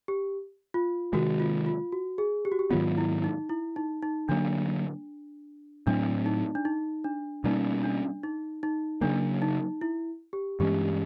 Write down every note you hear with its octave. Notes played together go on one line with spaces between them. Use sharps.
G4
F4
C3 D#3 G#3 F#4
F4
F4
F#4
G#4
G4
F#4
G4
G#2 D#3 F#3 B3 F4
E4
D#4
E4
D#4
D#4
D3 F#3 A#3 D4
A2 F#3 A3 C4 D4
D#4
D4
D#4
D4
B2 G3 A#3 C#4 D#4
D4
D#4
D#4
C#3 F#3 A#3 D4
D#4
E4
G4
G2 E3 G#3 C#4 G4